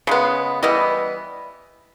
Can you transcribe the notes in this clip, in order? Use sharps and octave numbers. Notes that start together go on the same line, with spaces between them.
C#3 G#3 B3
E3 G3 B3 D#5